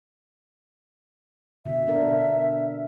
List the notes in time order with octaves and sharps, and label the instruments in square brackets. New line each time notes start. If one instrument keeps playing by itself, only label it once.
[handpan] B2 D3 [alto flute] E5
[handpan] B3 D4 A#4